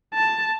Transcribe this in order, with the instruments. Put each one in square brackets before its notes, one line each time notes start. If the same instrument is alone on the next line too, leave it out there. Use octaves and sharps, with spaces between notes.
[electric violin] A5